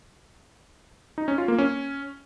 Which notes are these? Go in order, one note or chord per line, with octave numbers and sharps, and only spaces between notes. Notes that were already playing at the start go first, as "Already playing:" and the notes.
D#4
C#4
F4
A#3
C#4